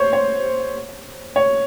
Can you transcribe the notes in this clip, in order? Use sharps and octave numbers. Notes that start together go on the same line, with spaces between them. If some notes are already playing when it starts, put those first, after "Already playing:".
Already playing: C5 C#5
C#5
C#5